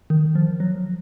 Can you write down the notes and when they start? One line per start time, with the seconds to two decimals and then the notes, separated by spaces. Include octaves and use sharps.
0.10 D#3
0.35 F3
0.60 F#3